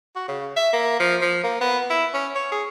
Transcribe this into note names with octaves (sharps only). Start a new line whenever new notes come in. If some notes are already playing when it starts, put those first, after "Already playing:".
F#4
C#3
E5
A#3
F3
F3
A#3
B3
E4
C#4
C#5
G#4